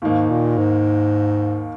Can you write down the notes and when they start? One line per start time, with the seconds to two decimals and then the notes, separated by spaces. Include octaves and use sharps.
0.02 D#2 G#2 D#3 A#3 D#4
0.30 A#2
0.58 G#2